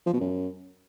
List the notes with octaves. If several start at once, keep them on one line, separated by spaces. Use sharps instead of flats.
F3
B2
F#2